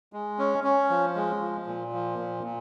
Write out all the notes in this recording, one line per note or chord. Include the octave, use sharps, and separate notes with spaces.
G#3
C#4
C#4
F3
G#3
F3
A#2
F3
A#2
A#2